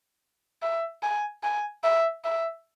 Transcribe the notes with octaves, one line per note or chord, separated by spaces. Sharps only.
E5
G#5
G#5
E5
E5